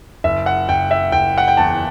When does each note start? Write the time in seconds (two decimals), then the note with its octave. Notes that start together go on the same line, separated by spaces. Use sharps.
0.24 F#1 E5
0.46 F#5
0.69 F#1 G5
0.91 E5
1.12 F#1 G5
1.38 F#5
1.48 G5
1.57 E2 A5